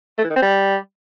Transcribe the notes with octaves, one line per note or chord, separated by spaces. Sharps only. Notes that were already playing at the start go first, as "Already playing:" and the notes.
A3
E3
D#3
C4
G3